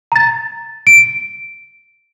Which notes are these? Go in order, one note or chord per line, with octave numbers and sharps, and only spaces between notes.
A#5 A6
D7